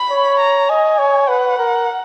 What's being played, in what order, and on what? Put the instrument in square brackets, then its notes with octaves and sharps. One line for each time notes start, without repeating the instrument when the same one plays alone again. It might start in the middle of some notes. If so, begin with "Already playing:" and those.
Already playing: [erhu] B5
[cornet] C#5
[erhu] A#5
[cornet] D#5 [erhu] G#5
[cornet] C#5
[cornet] B4 [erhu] F#5
[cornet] A#4